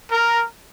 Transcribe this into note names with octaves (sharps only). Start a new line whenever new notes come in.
A#4